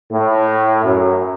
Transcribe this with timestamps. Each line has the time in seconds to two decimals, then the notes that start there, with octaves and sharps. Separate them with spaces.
0.11 A2
0.84 F#2